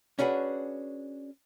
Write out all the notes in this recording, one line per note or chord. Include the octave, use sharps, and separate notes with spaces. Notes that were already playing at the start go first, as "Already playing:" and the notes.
C#4 D4 F#4 G#4 B4